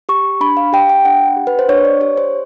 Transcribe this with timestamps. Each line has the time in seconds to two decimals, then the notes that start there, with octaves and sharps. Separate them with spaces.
0.09 G4 C#6
0.41 D4 B5
0.57 F5
0.73 G4 G5
0.89 G5
1.05 D4 F#5
1.37 G4
1.47 B4
1.59 C5
1.69 D4 C#5
1.85 D5
2.01 G4 C#5
2.17 C5